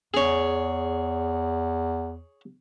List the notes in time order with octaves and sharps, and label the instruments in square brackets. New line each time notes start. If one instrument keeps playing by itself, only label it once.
[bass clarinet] E2 [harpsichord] G#4 C#5